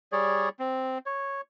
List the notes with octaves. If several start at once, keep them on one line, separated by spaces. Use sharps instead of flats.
G3 G#4 C#5 D5
C4
C#5